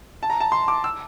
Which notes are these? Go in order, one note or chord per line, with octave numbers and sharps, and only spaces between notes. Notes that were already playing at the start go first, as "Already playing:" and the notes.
A5
A#5
A5
C6
D6
E6